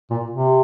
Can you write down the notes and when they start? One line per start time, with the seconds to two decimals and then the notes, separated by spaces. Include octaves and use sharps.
0.11 A#2
0.31 C3